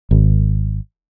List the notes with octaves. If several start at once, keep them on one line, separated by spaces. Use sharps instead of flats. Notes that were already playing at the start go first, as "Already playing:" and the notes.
G#1